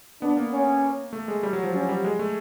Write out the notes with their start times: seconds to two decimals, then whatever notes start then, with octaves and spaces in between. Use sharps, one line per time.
0.22 B3 D4
0.37 A#3
0.52 C#4
1.13 A3
1.28 G#3
1.43 G3
1.53 F#3
1.63 F3
1.74 F#3 C#4
1.89 G3
2.04 G#3
2.19 A3